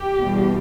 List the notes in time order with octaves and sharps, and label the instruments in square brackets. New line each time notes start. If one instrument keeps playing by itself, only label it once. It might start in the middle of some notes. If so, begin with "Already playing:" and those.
Already playing: [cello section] G4
E2 B2 G3